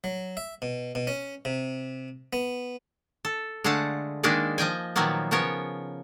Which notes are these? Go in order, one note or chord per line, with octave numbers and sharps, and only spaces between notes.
F#3
E5
B2
B2
C#4
C3
B3
A4
D3 G#3 A3 F5 F#5 A5
D#3 G#3 A#3 D4 D#4 D5
F3 D#5 G5 G#5
A#2 D#3 F3 F#3 A#3 B3
C#3 F3 B3 A#4 C#5